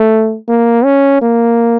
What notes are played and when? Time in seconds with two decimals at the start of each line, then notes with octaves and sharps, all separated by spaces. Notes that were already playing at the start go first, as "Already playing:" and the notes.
Already playing: A3
0.48 A#3
0.85 C#4
1.22 A#3